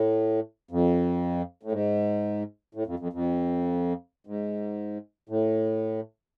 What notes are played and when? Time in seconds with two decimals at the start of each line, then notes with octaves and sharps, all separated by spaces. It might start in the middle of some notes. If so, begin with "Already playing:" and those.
Already playing: A2
0.71 F2
1.63 A2
1.72 G#2
2.75 A2
2.87 F2
2.99 F2
3.13 F2
4.27 G#2
5.29 A2